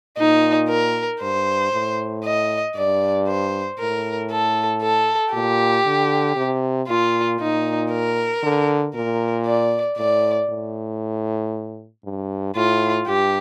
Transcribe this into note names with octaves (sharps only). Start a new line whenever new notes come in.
A#2 D#4
A#4
G2 C5
A2
D#5
G2 D5
C5
A2 A#4
A4
A4
A#2 G4
D3
C3
A#2 F4
A#2 D#4
A#4
D3
A#2 A#4
D5
A2 D5
A2
G2
A2 F4
G2 G4